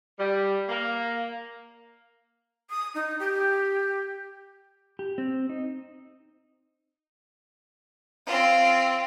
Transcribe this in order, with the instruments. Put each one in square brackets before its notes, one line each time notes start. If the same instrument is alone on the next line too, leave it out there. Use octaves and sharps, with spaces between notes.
[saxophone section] G3
A#3
[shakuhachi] D#6
D#4
G4
[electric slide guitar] G4
C4
D#4
[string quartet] C4 F4